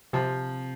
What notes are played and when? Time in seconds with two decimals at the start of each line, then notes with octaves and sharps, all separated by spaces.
0.13 C3 F3